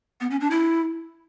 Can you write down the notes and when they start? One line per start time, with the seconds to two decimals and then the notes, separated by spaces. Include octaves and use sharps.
0.21 B3
0.31 C#4
0.41 D4
0.51 E4